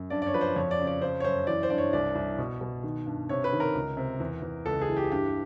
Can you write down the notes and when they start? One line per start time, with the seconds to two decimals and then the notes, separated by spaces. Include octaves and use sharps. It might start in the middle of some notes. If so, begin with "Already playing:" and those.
Already playing: F#2
0.10 G2 D5
0.22 D5
0.27 C#5
0.34 F3 B4
0.41 C5
0.56 F2 C#5
0.71 D5
0.79 C#3
0.87 D5
1.02 C#3 C5
1.20 C#5
1.24 F#2 C5
1.47 E3 D5
1.63 C5
1.70 G2 D5
1.78 C#5
1.93 C2 D5
2.15 C2
2.38 B2
2.61 B2
2.83 D#3
3.06 G2
3.29 C3 C#5
3.44 B4
3.53 D#3
3.60 A#4
3.75 C#2
3.97 C3
4.20 E2
4.42 E2
4.66 C#2 A4
4.81 G#4
4.89 E3
4.97 G4
5.12 G2 G4